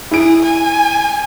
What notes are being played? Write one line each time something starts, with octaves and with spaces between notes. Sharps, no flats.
E4 G#4 D7
G#5